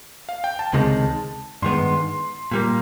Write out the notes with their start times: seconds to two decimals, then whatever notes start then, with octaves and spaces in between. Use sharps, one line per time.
0.29 F5
0.44 G5
0.59 A5
0.73 C#2 C3 D#3 G#3 A5
1.62 G2 D#3 G#3 B3 C6
2.52 A#2 G3 A#3